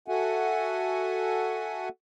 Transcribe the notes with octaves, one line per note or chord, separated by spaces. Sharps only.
F#4 A4 E5 F#5 G#5